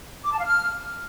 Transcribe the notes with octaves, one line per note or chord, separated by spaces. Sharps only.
D6
A5
F5
F6